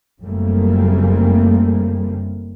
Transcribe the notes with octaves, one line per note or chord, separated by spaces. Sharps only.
F#1 C#3 G3 A3 A#3 C4